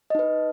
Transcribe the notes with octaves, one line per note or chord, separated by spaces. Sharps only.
D#4 B4 D#5